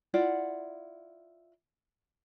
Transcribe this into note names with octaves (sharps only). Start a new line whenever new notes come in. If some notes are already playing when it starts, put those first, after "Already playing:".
E4 F4 D5 F#5